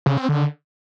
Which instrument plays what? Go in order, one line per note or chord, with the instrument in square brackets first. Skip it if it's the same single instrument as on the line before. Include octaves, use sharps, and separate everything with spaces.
[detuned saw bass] C#3
C4
D3